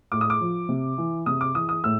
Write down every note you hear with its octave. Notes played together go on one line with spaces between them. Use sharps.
A2 D6
D#6
D6
F3
C3
E3
C3 D#6
D6
E3 D#6
D#6
A2 E6